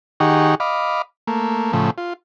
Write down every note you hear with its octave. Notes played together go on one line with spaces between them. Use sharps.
D#3 D#4 G4 G#4 F#5 C#6
D#5 F5 B5 D6
A3 A#3
A2 C#3 F3 A3
F4